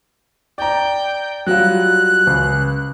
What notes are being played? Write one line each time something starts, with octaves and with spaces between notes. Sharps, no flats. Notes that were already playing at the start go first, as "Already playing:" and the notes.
D5 G5 A#5
F#3 G3 F4 F#6
C#2